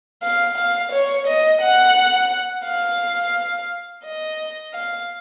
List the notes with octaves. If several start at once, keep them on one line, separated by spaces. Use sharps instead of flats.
F5
F5
C#5
D#5
F#5
F5
D#5
F5